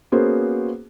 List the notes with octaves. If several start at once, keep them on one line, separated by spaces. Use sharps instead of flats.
A#3 B3 C#4 F#4 G#4 C5